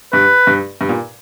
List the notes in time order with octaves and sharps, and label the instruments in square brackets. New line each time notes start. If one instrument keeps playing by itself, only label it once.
[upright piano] G2 [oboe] B4
[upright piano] G2
G2
A#2